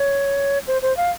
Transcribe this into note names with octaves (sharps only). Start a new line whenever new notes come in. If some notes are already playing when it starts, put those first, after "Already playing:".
Already playing: C#5
C5
C5
F5